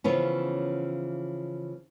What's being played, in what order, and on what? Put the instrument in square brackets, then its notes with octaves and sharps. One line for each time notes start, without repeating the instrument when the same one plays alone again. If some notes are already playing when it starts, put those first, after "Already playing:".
[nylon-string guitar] C#3 E3 F3 B3 C#4